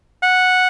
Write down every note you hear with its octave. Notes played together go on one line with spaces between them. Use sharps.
F#5